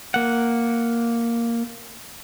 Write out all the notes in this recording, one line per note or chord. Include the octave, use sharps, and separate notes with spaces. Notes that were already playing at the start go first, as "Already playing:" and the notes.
A#3 F#5